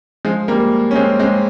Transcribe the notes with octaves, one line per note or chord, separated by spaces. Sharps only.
F3 G#3
G3 A#3
C#4
G#3 C4
G#3 C4